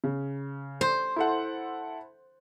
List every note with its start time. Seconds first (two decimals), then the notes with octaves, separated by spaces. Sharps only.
0.04 C#3
0.81 C5
1.16 E4 A4 F#5